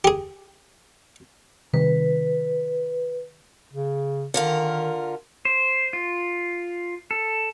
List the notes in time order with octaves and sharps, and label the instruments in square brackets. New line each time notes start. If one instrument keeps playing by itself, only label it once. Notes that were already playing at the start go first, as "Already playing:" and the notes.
[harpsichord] G4 G#4
[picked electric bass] C3 D#3 G3 [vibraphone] B4
[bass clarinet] C#3
[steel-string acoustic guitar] D3 F4 A#4 [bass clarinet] D#3
[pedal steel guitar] C5
F4
A4